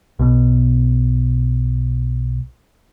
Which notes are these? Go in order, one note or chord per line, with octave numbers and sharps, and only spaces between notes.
B1 B2